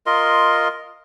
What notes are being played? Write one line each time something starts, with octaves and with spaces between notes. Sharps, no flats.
F4 A#4 D#5 C6